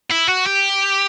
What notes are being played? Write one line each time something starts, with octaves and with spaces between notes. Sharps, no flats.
E4
F#4
G4